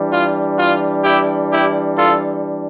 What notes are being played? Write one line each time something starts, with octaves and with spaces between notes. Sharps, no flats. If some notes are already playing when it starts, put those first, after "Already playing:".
Already playing: E3 G3 D4
F4
F4
E4 G4
E4 G4
F4 A4